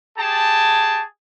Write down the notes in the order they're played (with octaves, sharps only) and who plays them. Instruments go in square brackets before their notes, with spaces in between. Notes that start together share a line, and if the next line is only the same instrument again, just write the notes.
[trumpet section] G4 G#4 A5